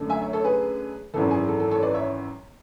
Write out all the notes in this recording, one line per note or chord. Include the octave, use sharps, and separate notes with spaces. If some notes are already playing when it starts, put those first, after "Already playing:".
Already playing: F#2 D3 A3 D4
E5 G#5
C#5 E5
A4 C#5
G#4 B4
G#1 F#2 E3 A4
G#4
A4
A4
A4 C#5
B4 D5
C#5 E5